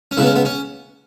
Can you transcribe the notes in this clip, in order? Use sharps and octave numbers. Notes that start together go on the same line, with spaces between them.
C#4
C#2 C#3 G#3 B3 E4
C#4
B3
C#4